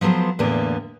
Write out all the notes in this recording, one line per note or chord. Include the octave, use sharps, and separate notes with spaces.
F3 F#3 B3 A4 C5
E2 A2 D3 A#3 B3